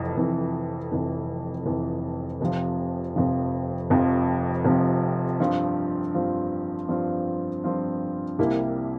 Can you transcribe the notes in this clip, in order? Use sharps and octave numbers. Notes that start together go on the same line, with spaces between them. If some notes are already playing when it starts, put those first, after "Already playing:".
Already playing: F1 F2 E3
F1 F2 E3
F1 F2 E3
F1 F2 E3
F1 F2 C3 F3
F1 F2 C3 F3
F1 F2 C3 F3
F1 F2 C3 F3
G2 F3 C4 F4
G2 F3 C4 F4
G2 F3 C4 F4
G2 F3 C4 F4
C2 C3 G3 A#3 E4